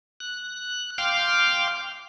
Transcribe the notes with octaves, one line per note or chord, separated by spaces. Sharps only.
F#6
F5 G5 C6 D6 F6